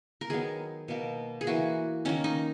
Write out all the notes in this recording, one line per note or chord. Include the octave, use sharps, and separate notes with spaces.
A#4
D#3 F#3 B3 G#4
B2 A#3
G#4
E3 A#3 F#4
D#3 F#3 A#3 C#4
D#4